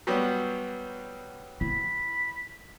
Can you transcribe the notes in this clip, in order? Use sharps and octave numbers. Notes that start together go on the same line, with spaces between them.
F#3 G3 B3 F#4 C#5 F#5
E4 B5